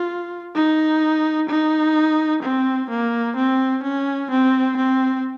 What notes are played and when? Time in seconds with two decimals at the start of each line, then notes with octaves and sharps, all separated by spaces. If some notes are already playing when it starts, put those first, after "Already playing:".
Already playing: F4
0.55 D#4
1.49 D#4
2.43 C4
2.90 A#3
3.36 C4
3.83 C#4
4.31 C4
4.77 C4